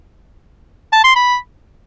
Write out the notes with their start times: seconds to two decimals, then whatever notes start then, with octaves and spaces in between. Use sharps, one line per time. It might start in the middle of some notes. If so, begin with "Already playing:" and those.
0.93 A5
1.04 C6
1.15 B5